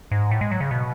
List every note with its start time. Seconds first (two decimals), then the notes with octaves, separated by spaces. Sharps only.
0.11 G#2
0.31 A2
0.41 G#3
0.51 F#3
0.61 C#3
0.71 B2